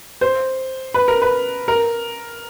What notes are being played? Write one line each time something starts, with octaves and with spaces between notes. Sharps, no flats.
C5
B4
A#4
B4
A#4